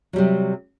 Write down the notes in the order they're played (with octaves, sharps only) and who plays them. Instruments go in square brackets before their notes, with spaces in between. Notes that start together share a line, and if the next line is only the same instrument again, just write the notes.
[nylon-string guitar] F#3
G3
C3